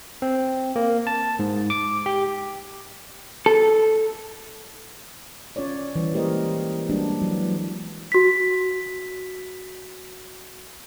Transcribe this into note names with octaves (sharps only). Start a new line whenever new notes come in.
C4
A#3
A5
G#2
D6
G4
A4
C#4 F4 C#5 D5
E3 G3
G#3 A#3 G4 A#4 C5 D#5
G3 G#3 A#3 D4 F#4
E3 F#3
F#4 B6